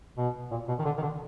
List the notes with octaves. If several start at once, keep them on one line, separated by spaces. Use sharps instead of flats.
B2
A#2
B2
D#3
D3
D#3
D3